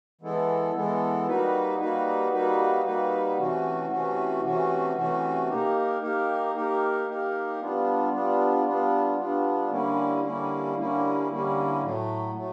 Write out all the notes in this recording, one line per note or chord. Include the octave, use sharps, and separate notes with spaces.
E3 G#3 B3 E4 A4
E3 G#3 B3 E4 A4
G3 A#3 D#4 F#4 B4
G3 A#3 D#4 F#4 B4
G3 A#3 D#4 F#4 B4
G3 A#3 D#4 F#4 B4
C3 E3 A3 C#4 F#4
C3 E3 A3 C#4 F#4
C3 E3 A3 C#4 F#4
C3 E3 A3 C#4 F#4
A#3 D#4 G4 A#4
A#3 D#4 G4 A#4
A#3 D#4 G4 A#4
A#3 D#4 G4 A#4
G3 B3 D4 F4
G3 B3 D4 F4
G3 B3 D4 F4
G3 B3 D4 F4
D3 G3 A#3 C#4 E4
D3 G3 A#3 C#4 E4
D3 G3 A#3 C#4 E4
D3 G3 A#3 C#4 E4
A2 F#3 A3
A2 F#3 A3